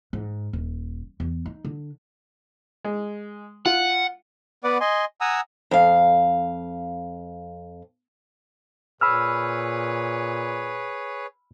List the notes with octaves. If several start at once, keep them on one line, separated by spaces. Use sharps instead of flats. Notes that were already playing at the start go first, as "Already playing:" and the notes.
G#2
D#1
E2
D#4
D3
G#3
F4 F#5
B3 B4 D5 F#5 D6
D#5 G#5 C6
F#5 G#5 A#5 D#6 E6
F2 F5
A#2 G#4 B4 C#5 B5 E6 F6